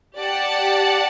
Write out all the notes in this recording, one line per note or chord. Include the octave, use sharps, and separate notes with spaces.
G4 D5 F#5 A5